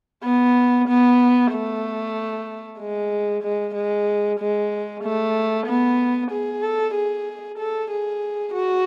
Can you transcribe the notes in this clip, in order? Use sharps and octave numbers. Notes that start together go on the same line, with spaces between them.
B3
B3
A3
G#3
G#3
G#3
G#3
A3
B3
G#4
A4
G#4
A4
G#4
F#4